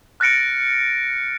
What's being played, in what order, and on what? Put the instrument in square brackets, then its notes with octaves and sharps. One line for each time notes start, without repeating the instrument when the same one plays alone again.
[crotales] F6 F#6 A6 A#6 C#7 D7